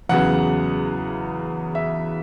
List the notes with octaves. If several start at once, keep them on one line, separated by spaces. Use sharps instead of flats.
E2 C#3 F#3 B3 F#5
E5